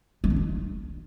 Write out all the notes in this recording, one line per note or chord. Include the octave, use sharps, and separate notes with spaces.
G#3
D#4
D4